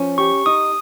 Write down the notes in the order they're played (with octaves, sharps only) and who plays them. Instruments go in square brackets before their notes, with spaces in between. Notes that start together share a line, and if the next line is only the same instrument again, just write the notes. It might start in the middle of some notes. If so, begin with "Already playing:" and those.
Already playing: [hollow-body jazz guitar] F3 C#4
[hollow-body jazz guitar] G4 [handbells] C#6
[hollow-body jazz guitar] D#4 [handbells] D#6